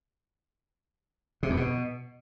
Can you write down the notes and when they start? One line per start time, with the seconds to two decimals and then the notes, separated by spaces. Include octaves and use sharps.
1.43 C3
1.50 E2
1.57 B2